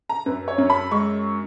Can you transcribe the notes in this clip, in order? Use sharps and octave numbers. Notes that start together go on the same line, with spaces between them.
A#5
F#2 B4
C#5
F#2
B5
G#3 C#6